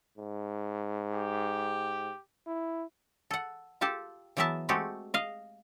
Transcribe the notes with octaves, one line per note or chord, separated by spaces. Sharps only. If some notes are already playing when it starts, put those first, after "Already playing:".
G#2
G4
E4
A4 F#5
F4 G4 A4 A5
E3 F#3 B3 A#4 E5 A5
G#3 A3 C4 F#4 G4 A4
D#5 F5